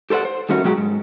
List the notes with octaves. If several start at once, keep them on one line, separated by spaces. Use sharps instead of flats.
G4 A4 C5 D5 F#5
C5
D#3 G3 A3 C#4 F#4 A#4
B2 F#3 G#3 F#4 G4
G#2